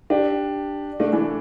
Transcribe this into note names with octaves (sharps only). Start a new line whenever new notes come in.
D4 G4
A3 D4
E3 A3